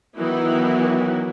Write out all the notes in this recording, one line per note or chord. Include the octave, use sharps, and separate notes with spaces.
D#3 E3 F#3 B3 D#4 E4